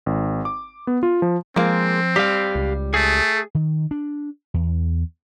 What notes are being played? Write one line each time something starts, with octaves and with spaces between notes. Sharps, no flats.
G#1
D6
B3
F4
F3
F3 G#3 A#3 C4
G3 G4 F5
C#2
A3 G#4
D#3
D4
E2